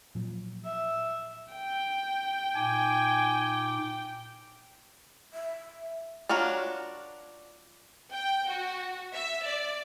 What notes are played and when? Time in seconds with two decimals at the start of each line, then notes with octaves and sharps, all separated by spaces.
0.15 A#2 F3 F#3
0.65 E5
1.54 G5
2.55 A#2 D#4 G#5 D6
5.34 E5
6.29 D4 F4 F#4 A#4 C#5
8.13 G5
8.50 F#4
9.14 E5
9.46 D5